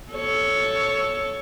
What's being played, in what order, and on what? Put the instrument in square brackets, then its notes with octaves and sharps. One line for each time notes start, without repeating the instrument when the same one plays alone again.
[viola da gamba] A4 C#5